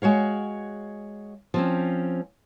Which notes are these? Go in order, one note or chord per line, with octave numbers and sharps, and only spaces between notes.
G#3 F#4 C#5 F5
F3 C4 C#4